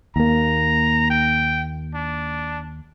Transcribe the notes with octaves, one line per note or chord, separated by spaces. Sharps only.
D#2 A#3 A#5
G5
D4